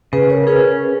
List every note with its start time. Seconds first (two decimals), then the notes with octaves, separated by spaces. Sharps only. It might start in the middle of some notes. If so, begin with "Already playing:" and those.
0.13 C#3 G#4 B4
0.30 A#4 C#5
0.47 C#4 G#4 B4